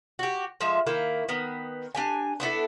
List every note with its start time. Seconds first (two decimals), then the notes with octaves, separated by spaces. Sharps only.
0.19 F#4 G4
0.61 F3 G#3 E5
0.86 D#3 A#3 E4
1.29 D#3 B3
1.95 D4 G4 G#5
2.40 B3 D4 E4 A4